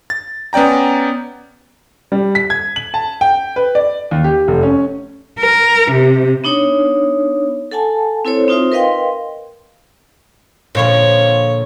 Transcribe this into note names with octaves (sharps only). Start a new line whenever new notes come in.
A6
B3 C#4 D5 G5 A#5
G3
B6
G#6
F#7
A5
G5
B4
D5
D#2
G4
F1
C#4
A#4
C3
B3 D4 D#4 C#5
A4 F#5 G#5 A5
C4 E4 A4 C5 C#5
C4 D#4 F4 C5 E5
A#4 B4 D#5 F5 G5 C6
A#2 D3 F3 C#5